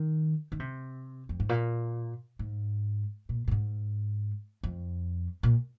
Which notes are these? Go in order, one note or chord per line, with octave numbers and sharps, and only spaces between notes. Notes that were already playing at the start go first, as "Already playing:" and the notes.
Already playing: D#3
D#3
C3
F2
G#2
A#2
G#2
A#2
A#2
G#2
F2
A#2